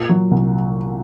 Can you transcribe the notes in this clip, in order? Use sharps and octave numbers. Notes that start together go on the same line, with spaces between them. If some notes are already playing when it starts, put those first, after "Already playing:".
Already playing: A#2
F#3
C2